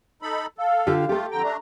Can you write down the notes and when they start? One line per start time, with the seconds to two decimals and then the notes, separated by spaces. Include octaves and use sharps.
0.22 D#4 A4 B5
0.58 A4 F5
0.87 D3 F4 G4
1.09 A3 F4 G4 A4
1.31 F2 D3 G5 A#5
1.43 A3 D4